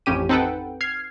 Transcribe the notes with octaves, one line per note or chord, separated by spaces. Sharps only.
A1 F2 C#4 G4 D#7
C4 D#4 A4 B4 F#5 G5
F6 G#6 C7